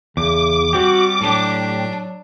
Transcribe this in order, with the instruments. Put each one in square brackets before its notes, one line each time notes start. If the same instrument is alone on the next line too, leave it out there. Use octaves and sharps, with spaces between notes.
[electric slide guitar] E2 [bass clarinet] C#3 [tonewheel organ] D6
[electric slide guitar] G3 C4 G4 [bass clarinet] F#4
[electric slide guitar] A2 G4 [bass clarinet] F#3 [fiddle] D4